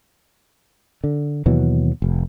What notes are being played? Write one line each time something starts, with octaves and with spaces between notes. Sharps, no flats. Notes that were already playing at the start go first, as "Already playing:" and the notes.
D3
D#2 B2 E3 F#3
F1